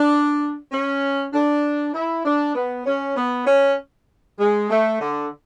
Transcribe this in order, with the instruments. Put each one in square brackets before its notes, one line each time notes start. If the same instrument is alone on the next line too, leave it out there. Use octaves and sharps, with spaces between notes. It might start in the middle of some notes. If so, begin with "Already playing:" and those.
Already playing: [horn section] D4
C#4
D4
E4
D4
B3
C#4
B3
C#4
G#3
A3
D3